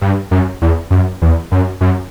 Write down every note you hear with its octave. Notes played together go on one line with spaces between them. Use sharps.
G2
F#2
E2
F#2
E2
F#2
F#2